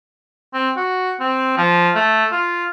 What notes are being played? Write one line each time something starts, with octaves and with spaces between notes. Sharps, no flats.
C4
F#4
C4
F3
A3
F4